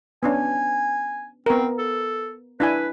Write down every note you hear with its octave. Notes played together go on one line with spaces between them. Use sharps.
B3 C#4 D4 G#5
B3 C4 A#4
A4
D4 E4 B4 G#5